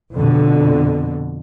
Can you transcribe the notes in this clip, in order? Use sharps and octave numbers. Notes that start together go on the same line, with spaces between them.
F2 B2 D3